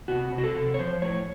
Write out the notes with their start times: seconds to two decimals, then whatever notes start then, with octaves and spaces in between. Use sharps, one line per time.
0.08 C3 F#4
0.32 C3
0.38 F#4
0.44 A4
0.55 C3
0.74 C#5
0.79 F3 C5
1.02 A2 C#5